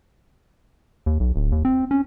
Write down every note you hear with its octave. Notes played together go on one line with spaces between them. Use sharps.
D#2
B1
D1
D#2
C4
C#4